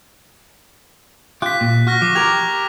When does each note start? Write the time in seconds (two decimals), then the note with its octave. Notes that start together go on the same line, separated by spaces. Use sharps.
1.42 F4 G4 F#6 B6
1.61 A#2
1.87 F#4 C#6 F6 A#6
2.02 F3 D6
2.15 G4 A#4 F6 G#6 F7